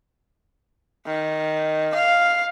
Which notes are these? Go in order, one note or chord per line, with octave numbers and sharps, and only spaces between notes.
D#3
F5